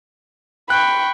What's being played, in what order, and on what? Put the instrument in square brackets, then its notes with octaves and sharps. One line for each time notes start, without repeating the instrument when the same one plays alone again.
[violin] G5 C#6 [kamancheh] B5 [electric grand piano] F#6